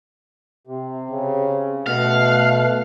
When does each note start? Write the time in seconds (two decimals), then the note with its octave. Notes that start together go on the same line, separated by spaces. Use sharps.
0.67 C3
1.11 C#3
1.87 B2 A3 F5 F#5 F#6